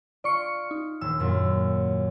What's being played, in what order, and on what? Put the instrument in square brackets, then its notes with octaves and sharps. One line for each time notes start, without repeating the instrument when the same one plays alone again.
[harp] F4 [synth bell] D5 C#6 C#7
[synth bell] D#4
[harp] D#1 [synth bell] E6
[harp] F#2 A#2